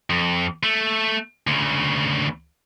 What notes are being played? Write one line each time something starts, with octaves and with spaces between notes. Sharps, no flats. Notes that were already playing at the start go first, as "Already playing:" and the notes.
F2
A3
D2 C#3